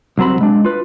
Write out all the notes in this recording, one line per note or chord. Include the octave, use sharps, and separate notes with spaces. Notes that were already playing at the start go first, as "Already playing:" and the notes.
C2 F#3 C4 B5
G#3 D4
F4 B4